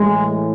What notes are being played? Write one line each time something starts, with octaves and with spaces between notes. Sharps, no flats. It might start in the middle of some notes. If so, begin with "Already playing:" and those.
Already playing: A2 E3 G#3